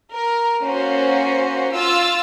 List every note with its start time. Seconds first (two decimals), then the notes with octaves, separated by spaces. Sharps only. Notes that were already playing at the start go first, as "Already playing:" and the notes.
0.12 A#4
0.64 A#3 C#4 F#4 C5
1.74 F4 E6 A6